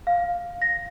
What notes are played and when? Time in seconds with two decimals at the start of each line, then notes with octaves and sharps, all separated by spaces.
0.07 F5
0.62 A#6